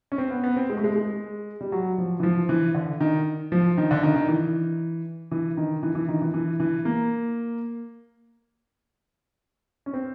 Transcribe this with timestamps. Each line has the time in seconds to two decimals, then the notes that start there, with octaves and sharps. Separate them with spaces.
0.12 C#4
0.18 C4
0.31 B3
0.44 B3
0.56 C4
0.70 G#3
0.77 A3
0.84 G#3
0.96 G#3
1.61 G3
1.72 F#3
1.98 F3
2.19 E3
2.23 F3
2.49 E3
2.75 D3
3.00 D#3
3.52 F3
3.78 D#3
3.91 D3
4.03 D#3
4.16 D#3
4.28 E3
5.31 E3
5.57 D#3
5.83 E3
5.95 E3
6.08 D#3
6.22 E3
6.34 E3
6.60 E3
6.85 A#3
9.86 C#4
9.94 C4